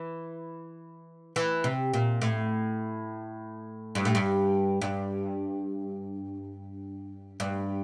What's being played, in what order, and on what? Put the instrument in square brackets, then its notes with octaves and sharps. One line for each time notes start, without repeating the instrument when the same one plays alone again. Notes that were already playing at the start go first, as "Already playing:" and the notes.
Already playing: [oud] E3
E3
C3
A#2
A2
G2
A2
G2
G2
G2